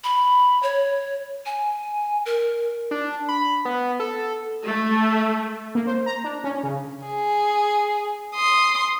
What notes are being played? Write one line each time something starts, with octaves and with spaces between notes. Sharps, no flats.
B5
C#5
G#5
A#4
D4
B5
B3
A4
A3
A#3
C5
A#5
D4
C#4
C#3
G#4
C6 D#6